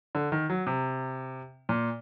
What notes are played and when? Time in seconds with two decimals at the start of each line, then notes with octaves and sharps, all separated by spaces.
0.15 D3
0.32 D#3
0.50 F#3
0.67 C3
1.69 A#2